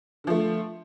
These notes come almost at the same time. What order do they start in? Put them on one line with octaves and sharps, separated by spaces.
D3 F3 A3